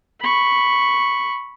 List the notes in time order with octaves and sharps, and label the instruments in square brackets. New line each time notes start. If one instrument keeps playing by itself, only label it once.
[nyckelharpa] B5 C#6